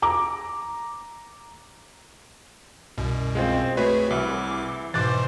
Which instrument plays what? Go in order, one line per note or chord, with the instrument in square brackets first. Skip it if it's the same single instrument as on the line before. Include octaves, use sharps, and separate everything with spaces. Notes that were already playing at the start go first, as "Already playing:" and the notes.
[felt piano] A#5 D6
[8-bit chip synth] C2 F#2 B2
[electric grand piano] G#3 F4 C5 [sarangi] C4
[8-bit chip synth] A3 F#4 [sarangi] G#4 [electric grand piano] B4 C#5
[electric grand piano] C2 [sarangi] E3 [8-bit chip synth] D6
[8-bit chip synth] G#2 B2 E3 [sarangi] C5 [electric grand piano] D6 F#6 A6